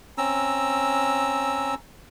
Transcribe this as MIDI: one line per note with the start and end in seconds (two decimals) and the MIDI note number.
0.18 1.75 60
0.18 1.75 61
0.18 1.75 82
0.18 1.75 88